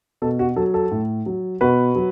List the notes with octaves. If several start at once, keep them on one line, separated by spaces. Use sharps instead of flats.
B2 A4
F#4
F#3 A4
A4
A2
F#3
B2 F#4 B4
F#3